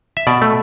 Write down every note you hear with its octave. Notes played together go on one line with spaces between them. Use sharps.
E5
B2 D5
A3